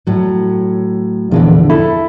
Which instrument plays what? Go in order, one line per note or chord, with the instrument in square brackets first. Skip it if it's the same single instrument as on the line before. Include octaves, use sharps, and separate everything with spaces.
[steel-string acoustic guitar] A2 F#3
[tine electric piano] A#1 E2 [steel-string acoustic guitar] D3 E3 F3
[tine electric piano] E4 [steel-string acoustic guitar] A4